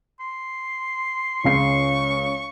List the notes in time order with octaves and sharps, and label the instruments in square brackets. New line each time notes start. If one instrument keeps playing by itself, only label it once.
[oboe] C6
[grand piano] C#2 C#3 C7 [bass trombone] C#4 [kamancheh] C#6